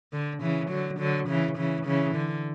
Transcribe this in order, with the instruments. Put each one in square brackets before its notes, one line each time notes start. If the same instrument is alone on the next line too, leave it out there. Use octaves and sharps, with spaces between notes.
[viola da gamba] D3
C#3 E3
D3 F#3
D3 F#3
C#3 E3
C#3 E3
C#3 E3
D3